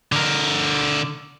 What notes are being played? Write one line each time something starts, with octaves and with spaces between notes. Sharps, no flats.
D3 A#4